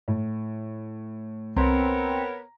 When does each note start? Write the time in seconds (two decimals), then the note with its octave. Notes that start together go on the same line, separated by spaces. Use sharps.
0.08 A2
1.56 C2 B3 C4 A#4 C#5 A#5